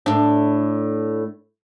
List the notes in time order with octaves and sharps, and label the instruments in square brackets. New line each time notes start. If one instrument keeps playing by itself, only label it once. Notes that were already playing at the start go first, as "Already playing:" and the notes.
[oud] A2 D4